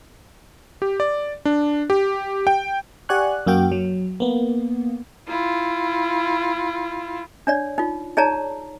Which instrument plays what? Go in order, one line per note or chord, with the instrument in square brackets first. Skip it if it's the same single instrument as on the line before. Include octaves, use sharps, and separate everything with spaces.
[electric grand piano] G4
D5
D4
G4
G5
[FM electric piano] G4 D5 F#5 G#5 C#6 F#6
F#2 A#3 F#4 G5
F#3
A#3 B3
[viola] E4 F4
[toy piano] D4 C#5 D5
D#4 F4
D#4 G#4 C#5 D5 A5 A#5